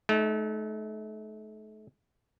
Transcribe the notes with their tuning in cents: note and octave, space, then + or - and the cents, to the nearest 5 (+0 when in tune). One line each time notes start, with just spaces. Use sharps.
A3 -35 D#4 +0